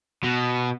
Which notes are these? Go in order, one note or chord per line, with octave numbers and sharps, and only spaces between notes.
B2